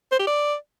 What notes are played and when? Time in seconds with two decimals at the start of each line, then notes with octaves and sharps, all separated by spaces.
0.12 C5
0.19 G4
0.27 D5